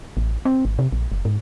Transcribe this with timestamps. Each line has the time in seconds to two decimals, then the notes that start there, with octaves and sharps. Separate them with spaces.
0.17 A1
0.45 C4
0.65 G#1
0.79 C3
0.92 A#1
1.12 F#1
1.25 G#2